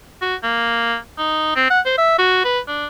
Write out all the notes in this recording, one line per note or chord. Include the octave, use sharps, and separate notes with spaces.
F#4
A#3
D#4
C4
F#5
C5
E5
F#4
B4
D4